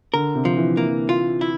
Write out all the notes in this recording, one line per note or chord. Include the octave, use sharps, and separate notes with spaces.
D3 A#4
C3
F3
E3
A#3
F4
E4